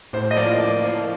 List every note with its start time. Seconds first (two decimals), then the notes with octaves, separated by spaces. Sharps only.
0.13 A2 C5
0.31 D#5
0.36 F3 A#3 D5
0.59 A2 D5
0.82 F3 A#3